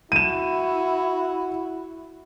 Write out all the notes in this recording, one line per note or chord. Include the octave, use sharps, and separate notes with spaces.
E4 F#4 D#7 E7